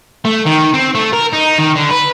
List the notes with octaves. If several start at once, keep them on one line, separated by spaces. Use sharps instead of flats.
A3
D#3
C4
A3
A#4
D#4
D#3
D3
B4